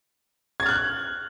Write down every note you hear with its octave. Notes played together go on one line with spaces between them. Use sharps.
F6 F#6 G#6 A6